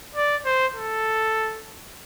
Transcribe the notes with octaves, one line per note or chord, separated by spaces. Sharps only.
D5
C5
A4